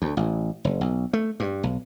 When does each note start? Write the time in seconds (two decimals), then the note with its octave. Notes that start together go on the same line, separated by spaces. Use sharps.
0.02 D2
0.17 A1
0.65 F#1
0.81 B1
1.13 A3
1.40 G2
1.63 B1